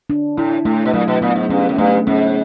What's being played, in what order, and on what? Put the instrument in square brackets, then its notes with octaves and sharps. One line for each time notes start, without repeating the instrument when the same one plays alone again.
[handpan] D4
[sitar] A2 [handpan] E4
[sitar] A2 [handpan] A3
[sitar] B2
[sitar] A#2 [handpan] F#3
[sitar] B2
[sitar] A#2 [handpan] B3
[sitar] G#2
[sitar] G2 [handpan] C#4
[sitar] F#2
[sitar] G2 [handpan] A3
[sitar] G#2 [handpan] C#4